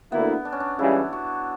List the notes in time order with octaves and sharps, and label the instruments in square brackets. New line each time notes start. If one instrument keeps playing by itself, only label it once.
[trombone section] D2 D3 A#3 E4 [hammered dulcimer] B3
[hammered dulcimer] D4
C#4
D4
[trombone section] C#2 C#3 E3 G3 [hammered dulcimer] E4
[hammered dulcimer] F#4